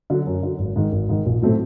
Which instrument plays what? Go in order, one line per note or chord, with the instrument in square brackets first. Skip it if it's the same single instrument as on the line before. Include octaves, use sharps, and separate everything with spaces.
[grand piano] D3 F#3
F#2
D3 F#3
G#1
G#2 D#3
G#1
G#2 D#3
A#1
A2 F#3 A3 C4